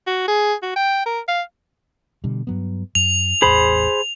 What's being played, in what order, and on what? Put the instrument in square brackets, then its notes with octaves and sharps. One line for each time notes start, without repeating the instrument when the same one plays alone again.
[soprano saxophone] F#4
G#4
F#4
G5
A#4
F5
[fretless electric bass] B2 D3 G3
G2 F#3 B3
[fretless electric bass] F#2 [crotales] F7
[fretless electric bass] A1 E2 [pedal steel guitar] G#4 C5 B5